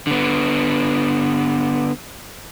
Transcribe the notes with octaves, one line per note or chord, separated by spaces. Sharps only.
D3 B3